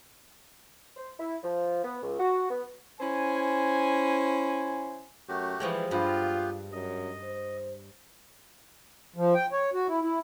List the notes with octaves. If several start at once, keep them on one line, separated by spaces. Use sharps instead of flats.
C5
E4
F3
B3
C#2
F#4
B3
C#4 E4 C5 G#5
F#2 A3 F#4 G4
E3 F3 G3 G#3
G2 B3 F4 G4 B4
F#2 D#5
C5
F3
G5
C#5
F#4
E4
E4